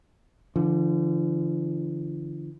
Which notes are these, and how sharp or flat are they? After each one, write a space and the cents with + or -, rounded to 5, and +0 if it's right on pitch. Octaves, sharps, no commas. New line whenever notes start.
D3 +0 F3 -45